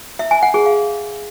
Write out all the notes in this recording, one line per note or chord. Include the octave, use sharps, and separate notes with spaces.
E5
G#5
F#5
G#4
F5